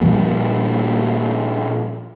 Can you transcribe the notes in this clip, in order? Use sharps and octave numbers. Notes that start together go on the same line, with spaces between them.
A#2 F3 G3 A#3